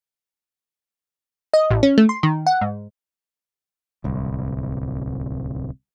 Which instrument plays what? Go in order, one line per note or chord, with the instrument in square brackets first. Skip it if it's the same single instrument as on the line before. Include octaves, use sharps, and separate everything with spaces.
[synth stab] D#5
A1
C#4
A3
C6
D#3
F#5
G#2
[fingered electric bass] D1 C2